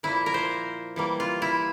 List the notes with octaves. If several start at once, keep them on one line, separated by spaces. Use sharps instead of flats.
A#2 F3 A#3 E4
A#4
C5
E3 G3 A#3
F4
E4